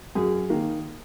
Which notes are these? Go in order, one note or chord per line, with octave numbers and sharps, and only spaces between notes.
F#2 G#4
D#3 A#3